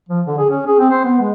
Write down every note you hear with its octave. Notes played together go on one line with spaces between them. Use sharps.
F3
D3
G#4
C#4
G#4
C4
C5
B3
G#3